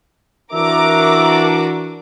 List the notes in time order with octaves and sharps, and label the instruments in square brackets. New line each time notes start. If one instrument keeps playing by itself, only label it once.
[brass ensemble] E3 D4 F#4 [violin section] A#4 A#5 D6 [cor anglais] E5